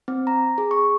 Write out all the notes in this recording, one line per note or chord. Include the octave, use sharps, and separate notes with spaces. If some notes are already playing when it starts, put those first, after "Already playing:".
C4
A#5
G#4
C#6